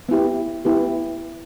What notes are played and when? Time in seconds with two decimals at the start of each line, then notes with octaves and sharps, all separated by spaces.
0.09 B3 E4 G4
0.65 B3 E4 G4